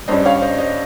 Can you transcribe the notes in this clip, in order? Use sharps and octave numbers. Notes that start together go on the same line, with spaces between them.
G2 G3 C#4 C5 D#5
C#5 F5
C5 D#5
C5 D#5